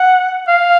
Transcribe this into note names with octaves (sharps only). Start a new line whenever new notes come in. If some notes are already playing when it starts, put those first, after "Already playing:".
Already playing: F#5
F5